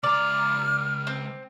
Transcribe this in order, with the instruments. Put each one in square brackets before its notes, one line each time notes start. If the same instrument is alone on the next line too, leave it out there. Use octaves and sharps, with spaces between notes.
[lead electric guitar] C#2 A#5 [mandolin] D5 [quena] F6
[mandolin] C4